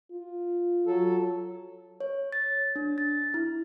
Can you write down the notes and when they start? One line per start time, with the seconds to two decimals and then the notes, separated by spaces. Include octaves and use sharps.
0.12 F4
0.86 F#3 A4
2.00 C#5
2.32 A6
2.76 D4
2.98 A6
3.34 E4